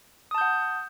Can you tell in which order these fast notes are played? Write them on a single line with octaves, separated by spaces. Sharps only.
D#6 A5 G6 F#5